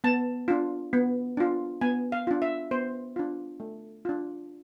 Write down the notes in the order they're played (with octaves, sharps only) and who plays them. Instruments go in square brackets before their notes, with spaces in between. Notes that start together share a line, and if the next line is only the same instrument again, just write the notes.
[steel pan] B3 A5
D4 F4
B3
D4 F4
B3 G#5
F5
D4 F4
E5
B3 C5
D4 F4
A3
D4 F4